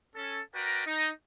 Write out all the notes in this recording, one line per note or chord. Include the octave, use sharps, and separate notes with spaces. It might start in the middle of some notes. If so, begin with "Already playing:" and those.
C#4 A4
F#4 A#4 B4 D5 G5 A#5
D#4